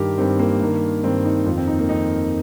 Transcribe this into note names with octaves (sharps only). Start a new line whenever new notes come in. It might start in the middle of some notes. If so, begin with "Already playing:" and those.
Already playing: G2 D#3 G4 A#4
G2 D#3 C4
A#3
G2 D#3
G2 D#3 C4
D#4
F2 D#3 F4
C4
D#4
A#3
F2 D#3 D#4